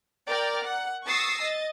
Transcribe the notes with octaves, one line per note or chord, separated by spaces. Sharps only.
A#4 D5 G5 F6
F#5
C#6 D#6 E6 A6 A#6 C7
D#5 A6